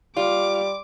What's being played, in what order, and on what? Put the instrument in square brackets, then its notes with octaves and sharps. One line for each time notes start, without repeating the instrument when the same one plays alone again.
[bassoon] G3 [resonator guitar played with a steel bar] F4 [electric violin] D6